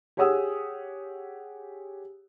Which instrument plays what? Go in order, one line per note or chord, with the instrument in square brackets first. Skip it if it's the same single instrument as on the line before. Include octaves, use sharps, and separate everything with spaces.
[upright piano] G4 G#4 C#5 F#5 D#6 E6